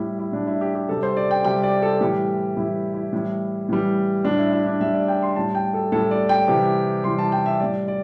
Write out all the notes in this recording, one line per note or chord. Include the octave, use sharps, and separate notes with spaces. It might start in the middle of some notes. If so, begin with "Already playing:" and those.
Already playing: A2 G3 E4
E4
A2 G3 D4
E4
G4
G4
C3 G3 A4
C5
D5
G5
C3 G3 G5
D5
A4
A2 E3 G3 G4
A2 E3 G3 E4
E4
A2 E3 G3
A2 E3 G3
A2 G3 D4
E4
E4
D4
A2 G3 E5
D5
G5
C6
A2 G3 A5
G5
A4
A2 G3 A4
D5
G5
C3 E3 G3
C3 E3 G3 C6
A5
G5
E5
A2 G3 D5
D5